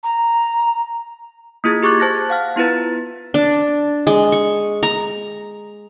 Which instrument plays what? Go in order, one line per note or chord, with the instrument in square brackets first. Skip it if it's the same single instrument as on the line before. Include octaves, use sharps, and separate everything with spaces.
[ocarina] A#5
[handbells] A#3 E4 F4 G#4 G#6
G4 G#4 C#6 D6 F#6 A6
C5 A5 F#6 A6 A#6
F5 F#5 F6
B3 E4 F4 B4 A6
[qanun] D4
G#3
C#6
A#5